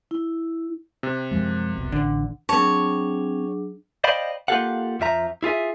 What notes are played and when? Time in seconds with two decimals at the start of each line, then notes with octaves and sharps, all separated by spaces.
0.11 E4
1.03 C3
1.31 F#2 F3 G#3
1.76 F1 C2 B2
1.92 A1 D3
2.49 F#3 C4 D4 G#4 C#5 A5
4.04 C5 D5 D#5 F5 G5 B5
4.48 A#3 F4 G4 A4 F5 F#5
5.00 F2 F3 E5 A#5
5.43 E4 F4 G#4 E5